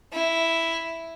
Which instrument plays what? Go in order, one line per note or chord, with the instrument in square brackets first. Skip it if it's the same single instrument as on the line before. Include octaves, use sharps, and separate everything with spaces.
[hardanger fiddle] E4